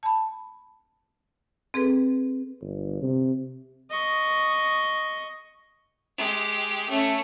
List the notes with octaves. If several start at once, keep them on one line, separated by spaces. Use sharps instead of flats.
A5 B5
C4 G#4 A4 B4
G1
C3
D#5 C#6
G#3 G4
A3 C#4